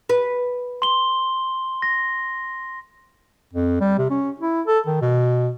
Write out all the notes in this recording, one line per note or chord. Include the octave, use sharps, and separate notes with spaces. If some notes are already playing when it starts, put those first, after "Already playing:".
B4
C6 G7
A#6
F2
G3
C3
C#4
E4
A4
D#3
B2